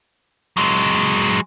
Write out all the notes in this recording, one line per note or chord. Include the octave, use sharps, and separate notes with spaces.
F#3 G#3